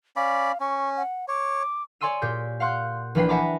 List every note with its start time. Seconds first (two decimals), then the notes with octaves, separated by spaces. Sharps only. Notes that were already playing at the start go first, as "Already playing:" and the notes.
0.16 C#4 D5 F5 B5
0.60 C#4 C#6
0.97 F#5
1.28 C#5 D6
2.01 C#5 D5 G#5 C6 E6 D#7
2.22 A#2 G4 G#4 G6
2.60 F5 F#5 C6 F#6 G6
3.15 A#1 E3 D4 B4 G5 C7
3.29 E5 F#5 G#5 A#5 B5 D6